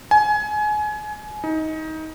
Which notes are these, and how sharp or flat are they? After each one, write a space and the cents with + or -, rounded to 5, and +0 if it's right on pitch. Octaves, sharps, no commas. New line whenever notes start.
G#5 +25
D#4 +20